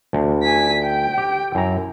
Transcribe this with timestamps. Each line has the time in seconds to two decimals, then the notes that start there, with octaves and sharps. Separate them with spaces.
0.13 D2
0.43 G#5 B6
0.83 G5
1.18 G4
1.55 F#2 E4 A#5